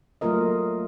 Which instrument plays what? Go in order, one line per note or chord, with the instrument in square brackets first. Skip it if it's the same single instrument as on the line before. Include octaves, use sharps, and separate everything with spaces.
[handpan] F#3 A3 A#3 F4 A#4 D#5